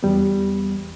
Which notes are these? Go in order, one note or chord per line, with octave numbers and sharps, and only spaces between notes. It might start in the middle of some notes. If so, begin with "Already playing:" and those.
E2 G3 B3